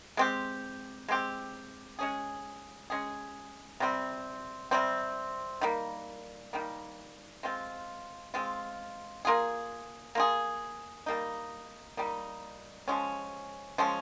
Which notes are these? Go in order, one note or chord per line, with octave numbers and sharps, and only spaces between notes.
G#3 C4 G4
G#3 C4 G4
G#3 C#4 G#4
G#3 C#4 G#4
C3 G3 C4
C3 G3 C4
D#3 G3 A#3
D#3 G3 A#3
G#3 C4 F4
G#3 C4 F4
A#3 F4 G#4
A#3 F4 G#4
G3 A#3 D#4
G3 A#3 D#4
F3 G#3 C#4
F3 G#3 C#4